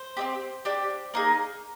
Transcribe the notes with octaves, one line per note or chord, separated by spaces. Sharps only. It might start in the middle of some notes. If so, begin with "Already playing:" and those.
Already playing: C5
C4 D#4 G4
D4 G4
A#3 D#4 G#4